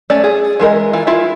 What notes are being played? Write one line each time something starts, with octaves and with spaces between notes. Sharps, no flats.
A3 C#4 D5
G#4
E3 G#3 A#4 D#5
E3 F4
E4 F4 E5